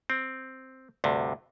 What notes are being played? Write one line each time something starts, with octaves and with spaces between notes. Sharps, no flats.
C4
D2 G2 C3